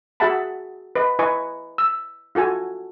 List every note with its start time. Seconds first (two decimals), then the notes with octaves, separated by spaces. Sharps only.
0.20 F#4 G#4 E5 F#5 A5 B5
0.96 B4 D#5
1.19 E4 B4 D#5 G#5 C#6
1.78 E6
2.35 F4 F#4 A4 G#5